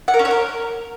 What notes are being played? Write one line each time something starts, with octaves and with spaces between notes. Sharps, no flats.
F#5
A#4
C#4
C#5
A#4